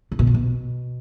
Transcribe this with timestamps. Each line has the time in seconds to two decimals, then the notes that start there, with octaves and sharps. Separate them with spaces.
0.12 C#3
0.19 B2
0.27 A#2
0.34 B2